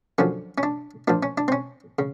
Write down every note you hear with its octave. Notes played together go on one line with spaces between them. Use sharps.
F#2 D3 F3 C#4
C#4
D4
A#2 F3 D4
C#4
D4
C4
C#4
C#3